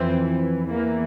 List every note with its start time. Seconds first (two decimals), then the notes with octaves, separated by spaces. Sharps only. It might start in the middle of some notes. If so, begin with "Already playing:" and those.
Already playing: F2 E3 C4
0.67 E2 E3 A#3